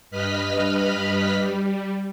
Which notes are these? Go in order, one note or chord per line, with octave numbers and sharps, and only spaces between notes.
G2 B4 D#5 B5 F6 B6
G3